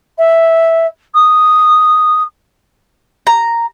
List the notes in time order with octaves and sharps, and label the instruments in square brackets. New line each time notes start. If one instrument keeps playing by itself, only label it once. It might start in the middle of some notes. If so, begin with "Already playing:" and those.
[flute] E5
D#6
[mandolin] A#5